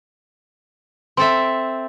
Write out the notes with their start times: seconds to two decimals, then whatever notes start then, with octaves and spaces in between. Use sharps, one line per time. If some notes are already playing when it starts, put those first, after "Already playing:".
1.17 C4 A4 E5 C6